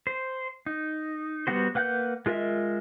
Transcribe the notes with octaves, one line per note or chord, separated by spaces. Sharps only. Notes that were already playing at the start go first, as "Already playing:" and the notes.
C5
D#4
G3 B3 F#4 C5
A#3 B4 F#5 F#6 G6
G#3 F4 A#4 D#5 E5